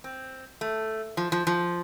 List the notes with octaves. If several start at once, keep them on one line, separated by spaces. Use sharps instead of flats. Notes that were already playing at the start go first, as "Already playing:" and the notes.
C4
A3
F3
F3
F3